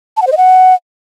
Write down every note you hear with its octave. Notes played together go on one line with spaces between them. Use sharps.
A5
F#5
C5
D#5
F#5